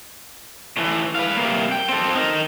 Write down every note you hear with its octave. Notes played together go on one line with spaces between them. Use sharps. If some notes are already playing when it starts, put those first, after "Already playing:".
A2 E3
B4 F5
C3 A#3
G5
C4 A4
D#4 A#4